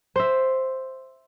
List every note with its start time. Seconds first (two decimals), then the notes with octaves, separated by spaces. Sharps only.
0.16 C5 E5